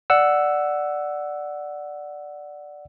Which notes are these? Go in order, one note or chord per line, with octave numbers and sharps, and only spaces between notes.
D5 F#5 E6